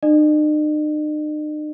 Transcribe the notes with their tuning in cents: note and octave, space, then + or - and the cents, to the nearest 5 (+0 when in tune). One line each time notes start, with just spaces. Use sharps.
D#4 -45 D#5 -45